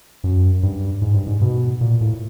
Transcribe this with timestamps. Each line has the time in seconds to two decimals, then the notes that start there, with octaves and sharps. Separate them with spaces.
0.24 F#2
0.63 G2
1.02 G#2
1.14 G2
1.27 G#2
1.41 B2
1.81 A#2
2.01 A2